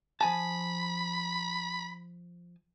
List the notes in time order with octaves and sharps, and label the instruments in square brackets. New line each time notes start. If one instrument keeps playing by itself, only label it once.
[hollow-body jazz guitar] F3 G#5 A5 [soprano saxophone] B5